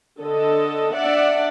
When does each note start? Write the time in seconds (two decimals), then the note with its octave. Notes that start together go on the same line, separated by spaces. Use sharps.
0.21 D3 A4 D#5
0.96 D4 D5 E5 F#5